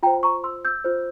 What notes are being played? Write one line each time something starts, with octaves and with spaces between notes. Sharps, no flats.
F4 C5 G5 A#5
A#5 C#6
C6 E6
E6 G6
F4 C5